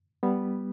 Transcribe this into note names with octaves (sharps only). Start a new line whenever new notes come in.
G3 B3